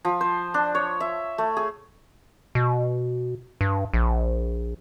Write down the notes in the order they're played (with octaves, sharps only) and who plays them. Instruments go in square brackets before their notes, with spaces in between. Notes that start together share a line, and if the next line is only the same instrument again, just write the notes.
[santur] F3
C5
D4
C#5
E5
A3
G#4
[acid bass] B2
G2
A#1